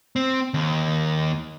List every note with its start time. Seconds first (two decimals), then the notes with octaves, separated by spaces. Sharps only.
0.16 C4
0.54 D#2